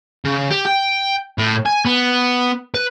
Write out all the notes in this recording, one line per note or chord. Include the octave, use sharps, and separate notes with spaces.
C#3
G4
G5
A2
G#5
B3
B4